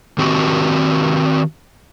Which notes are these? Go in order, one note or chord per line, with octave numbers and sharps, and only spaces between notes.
D#3 C4 F#4 G4